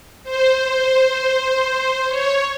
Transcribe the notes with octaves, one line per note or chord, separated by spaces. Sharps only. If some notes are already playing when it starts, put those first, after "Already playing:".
C5
C#5